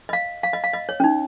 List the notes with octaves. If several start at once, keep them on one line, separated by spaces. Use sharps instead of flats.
D#5
F5
F5
D#5
F5
D#5
C#5
C#4
D#4